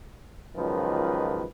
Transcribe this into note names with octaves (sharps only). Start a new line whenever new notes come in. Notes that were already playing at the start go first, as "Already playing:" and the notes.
C#2 F#2 D#3 F3 B4